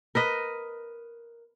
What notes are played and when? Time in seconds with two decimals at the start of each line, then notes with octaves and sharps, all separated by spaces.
0.15 A#4 B4 D#5